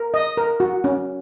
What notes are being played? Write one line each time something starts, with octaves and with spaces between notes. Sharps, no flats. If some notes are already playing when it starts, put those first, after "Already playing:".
Already playing: A#4
D#5
A#4
F#4
C#4